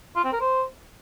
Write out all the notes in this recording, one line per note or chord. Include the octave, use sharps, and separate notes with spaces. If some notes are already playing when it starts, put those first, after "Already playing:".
F4
C4
A#4
C5